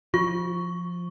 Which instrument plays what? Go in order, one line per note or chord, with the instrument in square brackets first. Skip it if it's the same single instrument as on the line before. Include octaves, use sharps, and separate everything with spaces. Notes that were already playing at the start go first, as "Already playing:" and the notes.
[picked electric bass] F3 [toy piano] F4 [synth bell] C#6